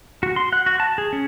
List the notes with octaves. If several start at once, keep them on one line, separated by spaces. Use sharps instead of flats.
F#4
C6
F#5
F#4
A5
G#4
C#4